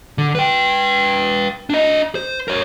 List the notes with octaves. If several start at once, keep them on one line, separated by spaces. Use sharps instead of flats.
D3
B4 G5
D4 D#5
C5
A#4 C#5